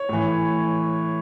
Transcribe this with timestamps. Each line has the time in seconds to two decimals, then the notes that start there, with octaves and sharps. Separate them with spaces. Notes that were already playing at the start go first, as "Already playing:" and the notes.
Already playing: C#5
0.09 A2 E3